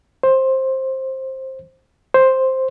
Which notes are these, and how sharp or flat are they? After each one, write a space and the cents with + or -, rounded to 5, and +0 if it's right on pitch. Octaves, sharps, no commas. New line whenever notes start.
C5 +15
C5 +5